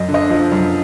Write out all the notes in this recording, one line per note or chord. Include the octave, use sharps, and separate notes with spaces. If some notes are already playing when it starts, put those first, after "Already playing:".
Already playing: F#2 D#5
D3
D#5
F3
F#2